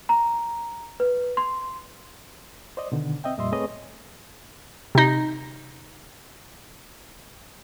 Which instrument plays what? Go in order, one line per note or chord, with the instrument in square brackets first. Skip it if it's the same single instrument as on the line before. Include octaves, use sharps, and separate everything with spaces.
[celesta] A#5
B4
C6
[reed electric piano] C5 D5 D#5
B2 D3 D#3
C4 D#5 E5 G5
F2 A#2 G3 D#5 E5 C6
A3 C4 G#4 B4 C#5 D#5
[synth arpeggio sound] C3 D#4